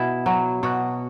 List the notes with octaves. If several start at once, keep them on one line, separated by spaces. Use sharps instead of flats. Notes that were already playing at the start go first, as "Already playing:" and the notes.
Already playing: B2 E4
F#3
B2 F#4